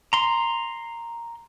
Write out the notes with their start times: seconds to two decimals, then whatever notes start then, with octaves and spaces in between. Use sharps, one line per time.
0.13 A#5 C6